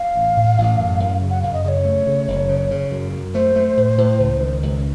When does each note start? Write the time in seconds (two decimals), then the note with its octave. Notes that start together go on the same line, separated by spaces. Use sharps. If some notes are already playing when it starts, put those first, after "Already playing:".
Already playing: F5
0.15 A1
0.37 A2
0.58 A1
0.79 F#2
1.00 F#2
1.22 C#3
1.30 F#5
1.42 F#2 F5
1.54 D#5
1.64 C#3 C#5 D#5
1.85 A3
2.07 C#3
2.28 F#1
2.49 C#3
2.71 C#3
2.91 F#2
3.13 F#2
3.34 A3 C5
3.56 A3
3.77 A2
3.98 A2
4.20 C#2
4.40 D#3
4.63 C#2